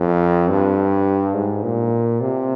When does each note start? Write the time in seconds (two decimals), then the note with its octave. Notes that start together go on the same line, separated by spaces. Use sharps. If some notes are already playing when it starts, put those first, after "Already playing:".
Already playing: F2
0.49 G2
1.35 G#2
1.63 A#2
2.21 C3